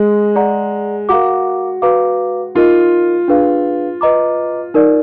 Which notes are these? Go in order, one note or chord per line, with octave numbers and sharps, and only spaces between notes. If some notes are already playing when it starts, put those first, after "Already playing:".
Already playing: G#3
G#4 D5 F#5 A#5
F#4 A#4 F5 A#5 D6
F#4 B4 F5 A#5 D6
D#4 F4 A#4 D#5
D4 G#4 B4 F5
B4 D#5 A#5 D6
D#4 A#4 D5